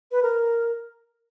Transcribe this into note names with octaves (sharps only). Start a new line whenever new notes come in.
B4
A#4